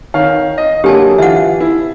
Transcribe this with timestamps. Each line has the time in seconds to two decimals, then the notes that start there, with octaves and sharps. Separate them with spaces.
0.14 D#3 C#5 F5
0.58 D#5
0.84 D3 F#3 A#3 G4 G#5 A5
1.18 E3 F4 E5 F#5
1.60 E4